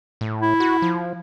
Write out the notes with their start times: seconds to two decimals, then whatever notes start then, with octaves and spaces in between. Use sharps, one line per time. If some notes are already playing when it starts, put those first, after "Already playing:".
0.21 A2
0.42 E4
0.60 F#4
0.82 F3